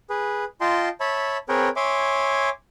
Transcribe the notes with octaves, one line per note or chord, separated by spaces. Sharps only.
G#4 B4
F4 D#5 G5 A5 C6
C#5 E5 A5 B5
C4 G#4 A#4 B4 C#5 G5
C#5 E5 G#5 C6 D6